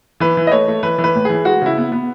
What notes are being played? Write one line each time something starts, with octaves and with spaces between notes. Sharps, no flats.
E3 B4
E3
D#5
A3 C#5
A3
E3 B4
E3
B4
A2
E3 G#4
G#3 F#4
C#3 E4
B3
B3